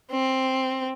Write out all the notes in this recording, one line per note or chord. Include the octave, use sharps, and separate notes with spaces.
C4